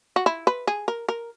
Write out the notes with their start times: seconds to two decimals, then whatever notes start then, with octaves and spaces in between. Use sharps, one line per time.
0.16 F#4
0.26 E4
0.47 B4
0.67 G#4
0.88 A#4
1.09 A#4